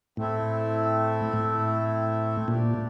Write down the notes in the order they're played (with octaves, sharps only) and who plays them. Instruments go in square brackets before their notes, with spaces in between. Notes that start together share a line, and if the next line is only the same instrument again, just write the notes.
[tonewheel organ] A2 [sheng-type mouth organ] A3 C4 E4 A4 E5
[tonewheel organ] A2
[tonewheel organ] A#2 [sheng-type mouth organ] D4 G4 D5